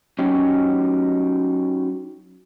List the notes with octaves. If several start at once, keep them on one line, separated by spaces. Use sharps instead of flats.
F#3 C#4 D#4 G4